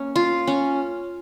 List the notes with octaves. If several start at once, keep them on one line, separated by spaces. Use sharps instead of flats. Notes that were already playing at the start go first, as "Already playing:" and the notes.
Already playing: A#3 C#4
F4
C#4